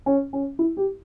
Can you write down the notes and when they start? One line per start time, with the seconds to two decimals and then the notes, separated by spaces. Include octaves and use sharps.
0.06 C#4
0.33 C#4
0.59 E4
0.77 G4